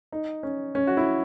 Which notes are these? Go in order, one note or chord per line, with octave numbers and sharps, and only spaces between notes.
D#4
C#4
C#4
F#4
E4